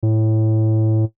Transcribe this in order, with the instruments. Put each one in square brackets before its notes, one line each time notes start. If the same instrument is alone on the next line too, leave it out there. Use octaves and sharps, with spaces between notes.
[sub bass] A2